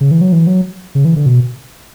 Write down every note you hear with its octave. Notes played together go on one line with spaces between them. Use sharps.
C#3
E3
F#3
E3
F#3
C#3
E3
D3
B2